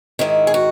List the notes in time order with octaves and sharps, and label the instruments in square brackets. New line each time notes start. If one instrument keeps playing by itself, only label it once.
[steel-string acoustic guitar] G#2 D#3 E4
G#4
F#4